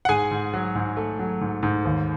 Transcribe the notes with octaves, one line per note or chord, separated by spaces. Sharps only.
F#5
G#2 G#4 G#5
G#2
F#3
G#2
A3
F#3
G#2
G#2
D#2